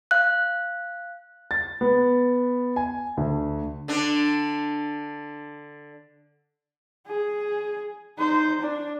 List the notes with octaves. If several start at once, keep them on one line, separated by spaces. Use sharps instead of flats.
F5 F#6
A6
B3
G#5
D2
D3 D4
G#4
D#4 C5
D4